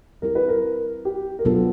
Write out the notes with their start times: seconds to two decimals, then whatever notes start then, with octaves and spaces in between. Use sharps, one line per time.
0.22 G3 C4 E4 G4 A#4
0.35 B4
0.49 A#4
1.05 G4
1.39 A#4
1.45 B2 F#3 B3 D4 F4 A4